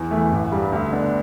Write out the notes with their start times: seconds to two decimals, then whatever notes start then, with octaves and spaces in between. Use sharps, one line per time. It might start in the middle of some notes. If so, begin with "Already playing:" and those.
Already playing: E2
0.11 E3 A3
0.32 A1
0.52 G2 G3
0.72 D2
0.93 D3 B3 D4